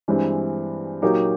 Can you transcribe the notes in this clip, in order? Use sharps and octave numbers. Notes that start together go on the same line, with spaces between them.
G2 E3 G#3 C4
A#2 F#3 A#3 D#4 G4